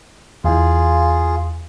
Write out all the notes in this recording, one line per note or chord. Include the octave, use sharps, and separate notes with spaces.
E2 E3 F4 G#4